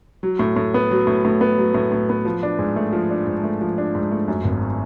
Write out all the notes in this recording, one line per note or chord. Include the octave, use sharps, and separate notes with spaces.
F#3
A2
A2
B3
F#3
A2
A2
B3
F#3
A2
A2
B3
F3
D4
G#2
A3
F3
D4
G#2
A3
F3
D4
G#2
A3
F#2
G#1